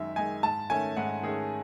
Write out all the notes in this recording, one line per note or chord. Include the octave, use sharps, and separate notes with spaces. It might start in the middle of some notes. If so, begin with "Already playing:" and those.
Already playing: F#2 D#3 G#3 D#4 E5
D#3 G#3 D#4 G#5
G#2 A5
D#3 A3 C#4 G#5
G#2 F#5
D#3 A3 C#4 G#4